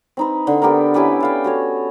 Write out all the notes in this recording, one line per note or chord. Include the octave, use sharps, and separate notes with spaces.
C4 D#4 B4
D3
B3 G4 A4 A#4
C#4 E4 G4 B4
A4 F5 G5
F#4 A4 C#5